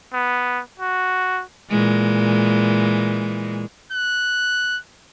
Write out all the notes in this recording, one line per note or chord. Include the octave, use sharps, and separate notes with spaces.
B3
F#4
A#2 E3 G#3
F#6